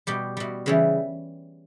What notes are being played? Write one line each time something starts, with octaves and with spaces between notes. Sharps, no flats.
B2 G3 G4
B2 G3
C#3 E3 G3